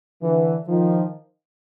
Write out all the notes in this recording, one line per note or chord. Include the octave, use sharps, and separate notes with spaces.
D3 E3
D#3 F3